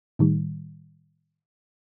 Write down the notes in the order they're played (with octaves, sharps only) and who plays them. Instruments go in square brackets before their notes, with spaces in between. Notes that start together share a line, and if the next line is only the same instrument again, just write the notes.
[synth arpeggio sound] A2 D#3 G3